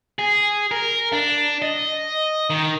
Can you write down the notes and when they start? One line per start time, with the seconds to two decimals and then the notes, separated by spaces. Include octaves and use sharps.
0.19 G#4
0.71 A#4
1.13 D4
1.62 D#5
2.50 D#3